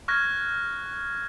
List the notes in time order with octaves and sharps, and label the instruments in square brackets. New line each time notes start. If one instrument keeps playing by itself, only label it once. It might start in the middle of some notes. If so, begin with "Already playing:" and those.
[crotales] C#6 F6 F#6 G#6 A#6